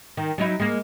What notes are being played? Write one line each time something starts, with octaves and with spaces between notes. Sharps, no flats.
D#3
F#3 D#4 E4
G#3 A#3